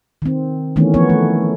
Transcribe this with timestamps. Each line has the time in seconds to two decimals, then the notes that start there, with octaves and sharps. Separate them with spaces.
0.22 D#3 C4
0.76 D#3 E3 A3 B3 C#4
0.94 F3 B3 C#5
1.09 A3